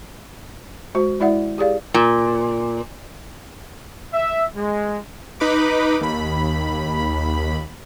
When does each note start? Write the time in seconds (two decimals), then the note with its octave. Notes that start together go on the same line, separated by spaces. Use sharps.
0.95 G#3 F#4 C5
1.20 G#3 E4 D5 E5 F#5
1.58 G4 G#4 D5 F5
1.94 A#2
4.14 E5
4.56 G#3
5.40 D#4 B4 B5 D6
6.01 D#2 B5